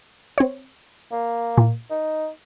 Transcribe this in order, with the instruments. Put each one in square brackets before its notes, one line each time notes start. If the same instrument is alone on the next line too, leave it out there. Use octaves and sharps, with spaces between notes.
[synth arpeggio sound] C4 C#5
[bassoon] A#3
[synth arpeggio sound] A#2
[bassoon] D#4